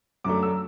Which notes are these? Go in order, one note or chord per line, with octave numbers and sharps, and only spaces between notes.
F#2 D3 F#3 A3 D6
E6